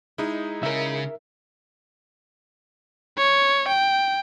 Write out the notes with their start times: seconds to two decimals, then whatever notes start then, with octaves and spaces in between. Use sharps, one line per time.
0.18 G#3 D#4 E4
0.63 C#3 C#4 A#4 E5
3.18 C#5
3.68 G5